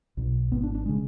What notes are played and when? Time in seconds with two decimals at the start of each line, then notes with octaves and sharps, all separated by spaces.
0.17 B1 B2
0.51 G#1 G#2 B3
0.64 D4
0.75 D4
0.86 C#3 G#3